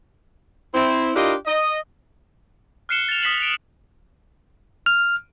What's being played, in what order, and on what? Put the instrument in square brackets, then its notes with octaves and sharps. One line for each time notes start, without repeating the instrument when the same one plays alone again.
[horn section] C4 E4
D4 E4 F4 G4 A#4 D#5
D#5
[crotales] F6 F#6 C7 C#7 E7 G7
A6 F7
D#6 F6 B6 C7 E7 F#7
D7
[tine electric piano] F6